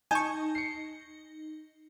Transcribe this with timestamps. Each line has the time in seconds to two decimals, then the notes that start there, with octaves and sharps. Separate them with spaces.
0.11 D#4 G#5 A5 C#6 G6
0.55 C7 C#7